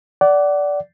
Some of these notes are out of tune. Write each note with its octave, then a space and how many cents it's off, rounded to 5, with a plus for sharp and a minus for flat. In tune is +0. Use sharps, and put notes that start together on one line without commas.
D5 -15 F#5 +25